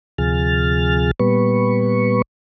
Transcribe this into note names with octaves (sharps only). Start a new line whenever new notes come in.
D2 C3 F3 G#4 F6 A6
A#2 G3 B3 B4 C#6